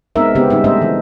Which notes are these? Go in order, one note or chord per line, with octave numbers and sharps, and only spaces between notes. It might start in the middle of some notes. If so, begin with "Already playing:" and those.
G#3 B3 C4 D#4 A#4 E5
C#3 G#3 B3 C4 G4
G3 D#4 E5
G#3 A3 D4 C5 D#5 E5
E3